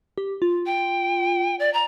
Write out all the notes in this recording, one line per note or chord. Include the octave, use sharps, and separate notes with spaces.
G4
F4
G5
D5
A#5